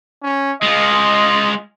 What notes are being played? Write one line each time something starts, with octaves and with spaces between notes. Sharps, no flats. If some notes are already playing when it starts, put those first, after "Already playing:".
C#4
G#3 F4 D#5